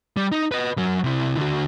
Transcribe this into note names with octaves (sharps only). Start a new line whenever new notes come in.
G3
D#4
B4 D#5
F#3 A#4
C3 E4
D3 F#4